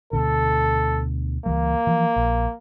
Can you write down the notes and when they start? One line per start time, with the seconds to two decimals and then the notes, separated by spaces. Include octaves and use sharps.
0.13 D2 B2 D3 A4
1.46 C#2 E3 G3 A#3
1.87 E3 F3
2.16 A#1